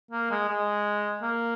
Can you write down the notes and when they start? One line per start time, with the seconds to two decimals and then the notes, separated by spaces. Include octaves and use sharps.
0.11 A#3
0.31 G#3
0.48 G#3
1.22 A#3